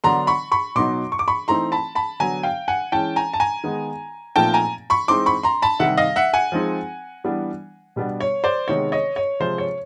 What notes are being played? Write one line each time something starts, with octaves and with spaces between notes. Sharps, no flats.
D3 F#3 B3 D4 A#5 C6
B5 C#6
B5 C#6
B2 F#3 B3 D#4 C6 D6
C#6
D6
B5 C#6
E3 A3 C4 D#4 A#5 C6
A5 B5
A5 B5
D3 F#3 B3 G#5 A#5
F5 G5
F#5 G#5
E3 G#3 C#4 G5 A5
G#5 A#5
A5
G#5 A#5
D#3 G#3 B3 D#4
A#2 F3 A3 C4 D#4 G5 A5
G#5 A#5
B5 C#6
E3 G#3 C4 D#4 C6 D6
B5 C#6
A#5 C6
A5 B5
C3 D#3 G3 E5 F#5
D#5 F5
E5 F#5
F#5 G#5
F3 G#3 C4 D#4
E3 G3 B3 D4
B2 G3 B3 D4
C#5
C5 D5
C3 D#3 G#3 B3 C#5
C#5 D#5
C#5
C3 F3 G#3 C5
C#5